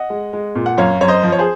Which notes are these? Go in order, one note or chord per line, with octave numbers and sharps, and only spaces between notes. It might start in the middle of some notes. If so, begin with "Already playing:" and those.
Already playing: D#5 F#5
G#3
G#3
A#2
F#5
F#2 C#5 F5
F#2 C#5
C5 D#5
F3
C#5
G#4 C5